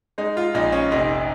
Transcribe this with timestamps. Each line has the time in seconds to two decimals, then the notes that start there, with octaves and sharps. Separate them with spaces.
0.18 G#3 D#4
0.37 F4
0.54 A#1 D#4
0.72 C#4
0.92 F1 D#4